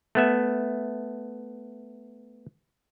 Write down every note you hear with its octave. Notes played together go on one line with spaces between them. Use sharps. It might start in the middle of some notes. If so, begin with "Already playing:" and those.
A3 B3 E5